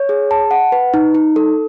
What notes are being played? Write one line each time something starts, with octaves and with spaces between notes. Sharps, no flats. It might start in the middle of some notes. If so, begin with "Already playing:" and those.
Already playing: C#5
G#4
A5
F#5
B4
D#4
D#4
A4